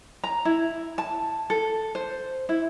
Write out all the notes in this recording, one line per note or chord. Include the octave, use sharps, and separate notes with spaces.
A#5
E4
A5
A4
C5
E4